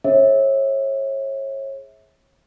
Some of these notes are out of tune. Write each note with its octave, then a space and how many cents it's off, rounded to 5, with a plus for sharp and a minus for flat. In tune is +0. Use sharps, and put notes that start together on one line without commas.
G#4 +0 C#5 -35 E5 -20